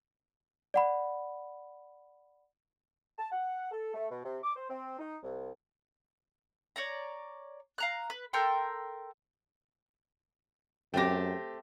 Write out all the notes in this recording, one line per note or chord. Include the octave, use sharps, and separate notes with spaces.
D5 F#5 B5
A5
F#5
A4
A3
B2
C3
D6
C5
C4
D#4
C2
C#5 D5 A#5
F5 A#5 F#6
B4
A4 A#4 G5 C6
F#2 A3 C4 G4 G5 A#6